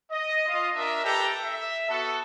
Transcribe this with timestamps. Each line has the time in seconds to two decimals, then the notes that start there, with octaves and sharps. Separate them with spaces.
0.11 D#5
0.47 F4 D#5
0.75 D4 A#4 E5
1.04 G4 A4 B4 G5 A#5
1.43 E5
1.89 B3 F#4 A4